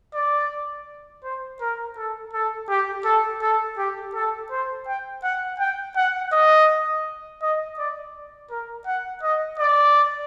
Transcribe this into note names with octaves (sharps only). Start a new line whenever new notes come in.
D5
C5
A#4
A4
A4
G4
A4
A4
G4
A4
C5
G5
F#5
G5
F#5
D#5
D#5
D5
A#4
F#5
D#5
D5